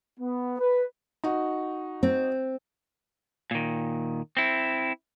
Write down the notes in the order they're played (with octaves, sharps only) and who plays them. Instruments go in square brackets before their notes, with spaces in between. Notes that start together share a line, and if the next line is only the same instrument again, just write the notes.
[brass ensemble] B3
B4
[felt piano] D#4 F#4
[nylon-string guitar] C4
[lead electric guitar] A#2 D#3
C4 E4